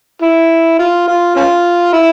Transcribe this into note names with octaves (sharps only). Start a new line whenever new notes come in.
E4
F4
F4
C#4 F4
E4